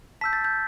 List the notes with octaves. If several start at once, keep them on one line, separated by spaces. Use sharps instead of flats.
A5 E6 G6 B6
A6
G6